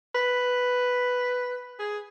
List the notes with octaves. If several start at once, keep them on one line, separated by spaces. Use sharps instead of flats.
B4
G#4